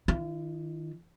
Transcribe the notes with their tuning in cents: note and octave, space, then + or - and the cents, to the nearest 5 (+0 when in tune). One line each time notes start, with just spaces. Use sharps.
D#3 +0 F4 -45